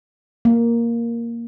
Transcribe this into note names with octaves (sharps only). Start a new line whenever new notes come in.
A#3